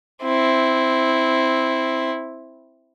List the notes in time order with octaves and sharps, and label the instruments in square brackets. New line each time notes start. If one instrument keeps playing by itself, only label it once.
[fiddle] C4 E4